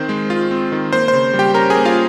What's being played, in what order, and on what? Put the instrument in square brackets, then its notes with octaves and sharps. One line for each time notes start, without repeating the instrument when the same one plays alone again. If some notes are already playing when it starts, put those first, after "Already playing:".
Already playing: [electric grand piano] D#3 C4 C5
G#3
F4
C4
D#3
A#3 C5
C5
C#3
G3
G4 G5
C#4 A#4 A#5
G#4 G#5
A#3
F4 F5